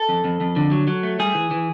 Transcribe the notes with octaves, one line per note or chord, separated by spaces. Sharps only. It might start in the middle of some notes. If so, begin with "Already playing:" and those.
Already playing: A4
F2
F2
F2
D3
F#3
F#3
A3
G3 G#4
E3
E3